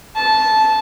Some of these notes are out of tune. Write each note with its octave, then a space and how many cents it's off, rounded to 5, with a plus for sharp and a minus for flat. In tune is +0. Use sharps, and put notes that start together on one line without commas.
A5 -10